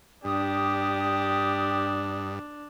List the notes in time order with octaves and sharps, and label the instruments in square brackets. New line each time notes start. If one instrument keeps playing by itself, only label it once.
[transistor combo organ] G2 [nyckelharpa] D4 [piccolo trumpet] G4 [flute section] D#6